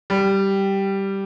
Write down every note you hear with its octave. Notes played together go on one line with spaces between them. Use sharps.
G3